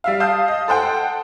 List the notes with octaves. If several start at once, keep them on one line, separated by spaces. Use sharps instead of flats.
G3 E5 F5
F5 A5 D#6 G6
D#5
A4 C5 F#5 G5